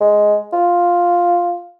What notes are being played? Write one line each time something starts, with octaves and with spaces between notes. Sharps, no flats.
G#3
F4